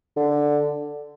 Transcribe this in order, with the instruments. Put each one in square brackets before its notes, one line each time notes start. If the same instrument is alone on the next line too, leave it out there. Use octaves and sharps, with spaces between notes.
[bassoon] D3